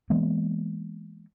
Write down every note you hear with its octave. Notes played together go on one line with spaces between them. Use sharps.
E3 G#3 A#3 B3